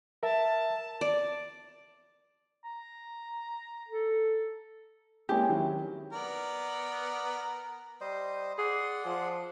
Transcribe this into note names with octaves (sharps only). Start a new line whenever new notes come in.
A#4 E5 A5
D5
A#5
A4
G#3 A#3 C4 C#4 E4 G4 G#5
D#3 F#3 C4 E4
B3 A#4 D5
G3 C5 D#5
G#4 D5 F#5 C6
F3